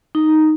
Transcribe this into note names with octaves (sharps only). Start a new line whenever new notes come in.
D#4